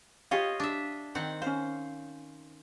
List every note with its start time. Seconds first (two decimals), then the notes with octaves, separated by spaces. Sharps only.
0.31 F4 G4 C#5 D#5 F5
0.60 D4 E5
1.15 D#3 C4 F#5
1.42 C#4 C5 F5